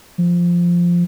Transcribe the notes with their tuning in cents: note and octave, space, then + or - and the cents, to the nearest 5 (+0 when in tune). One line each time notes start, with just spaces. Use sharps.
F3 -5